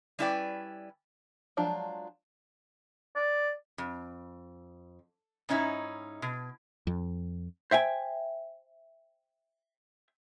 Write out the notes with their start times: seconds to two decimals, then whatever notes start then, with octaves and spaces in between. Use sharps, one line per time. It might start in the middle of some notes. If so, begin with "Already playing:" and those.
0.19 G3 C#4 E4 B4 D5 G5
1.57 F3 F#3 G#3 D4 F4
3.15 D5
3.78 F2
5.49 G#2 C#4 D#4 E4
6.22 B2
6.87 F2
7.71 C5 E5 G5 G#5